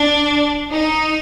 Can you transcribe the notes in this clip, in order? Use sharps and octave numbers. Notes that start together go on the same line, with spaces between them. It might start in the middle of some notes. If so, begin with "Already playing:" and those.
Already playing: D4
D#4